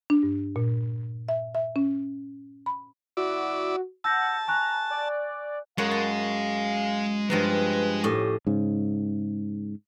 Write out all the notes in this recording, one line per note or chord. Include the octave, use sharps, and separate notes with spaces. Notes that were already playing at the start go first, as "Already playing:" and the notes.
D4
G2
A#2
E5
E5
C#4
B5
E4 F#4 D5
F#5 A5 E6 G6 A#6
G#5 A#5 C#6 F#6
D5
F#2 G#3 C#5 F5 F#5
A5
G2 F3 G#3 B4 A#5
A2 C#4 G4 D#5
G#2 C#3